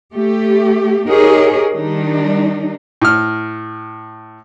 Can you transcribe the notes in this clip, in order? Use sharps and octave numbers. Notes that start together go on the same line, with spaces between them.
A3 G4
D#4 G4 G#4 A#4 C#5
D#3 G3 D4 D#4
A2 F6